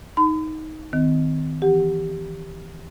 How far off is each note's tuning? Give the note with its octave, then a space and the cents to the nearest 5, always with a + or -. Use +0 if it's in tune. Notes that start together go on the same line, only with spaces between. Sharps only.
D#4 +10 B5 +45
D#3 +10 C4 -40
E3 +30 G4 +0 F#5 +0